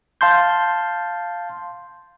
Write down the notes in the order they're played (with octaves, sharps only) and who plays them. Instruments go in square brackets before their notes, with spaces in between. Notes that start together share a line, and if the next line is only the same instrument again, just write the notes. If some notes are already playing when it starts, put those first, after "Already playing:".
[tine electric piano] F5 A5 C6 G6